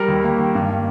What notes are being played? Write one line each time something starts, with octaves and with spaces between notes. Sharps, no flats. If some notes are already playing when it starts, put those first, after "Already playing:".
Already playing: G3 A#4
D#2
A#3
D#3
G2
A#3